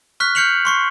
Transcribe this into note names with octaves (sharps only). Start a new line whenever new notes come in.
C#6 F6 F#6 B6
F6 G6 C7 C#7 F7 F#7
C6 C#6 C7